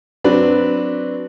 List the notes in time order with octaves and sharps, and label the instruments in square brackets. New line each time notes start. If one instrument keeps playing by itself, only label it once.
[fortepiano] F#3 C4 D4 B4 D5